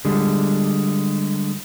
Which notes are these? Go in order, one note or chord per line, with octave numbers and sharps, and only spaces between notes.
D3 G3 G#3